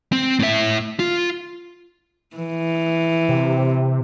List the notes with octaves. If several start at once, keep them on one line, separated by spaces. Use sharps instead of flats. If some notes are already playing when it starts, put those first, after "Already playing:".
C4
A2 E5
F4
E3
C3